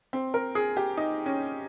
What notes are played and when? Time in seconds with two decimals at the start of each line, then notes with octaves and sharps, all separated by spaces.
0.13 C4
0.34 A#4
0.55 G#4
0.77 G4
0.97 D#4
1.26 C#4